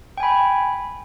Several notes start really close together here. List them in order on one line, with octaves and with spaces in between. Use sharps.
G5 G#5 B5